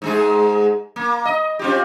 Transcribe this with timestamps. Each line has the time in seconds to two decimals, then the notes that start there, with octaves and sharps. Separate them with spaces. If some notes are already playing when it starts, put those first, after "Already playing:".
0.02 G#2 G#3 G#4
0.96 A#3
1.25 D#5
1.59 C4 F4 G4